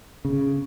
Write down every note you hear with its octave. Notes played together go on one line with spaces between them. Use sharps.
C#3